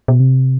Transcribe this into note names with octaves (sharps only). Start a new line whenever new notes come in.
B2
C3